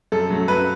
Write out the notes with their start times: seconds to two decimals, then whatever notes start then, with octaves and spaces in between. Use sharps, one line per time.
0.12 F#2 A4
0.30 F#3 A3
0.48 F#2 B4